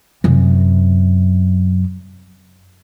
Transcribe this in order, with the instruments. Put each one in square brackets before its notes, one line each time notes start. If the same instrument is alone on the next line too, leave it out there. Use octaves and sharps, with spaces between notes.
[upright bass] F#2 C3